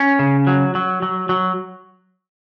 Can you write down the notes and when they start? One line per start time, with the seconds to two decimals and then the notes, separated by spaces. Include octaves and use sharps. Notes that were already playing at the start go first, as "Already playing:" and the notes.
Already playing: C#4
0.19 C#3
0.47 F#3
0.75 F#3
1.02 F#3
1.29 F#3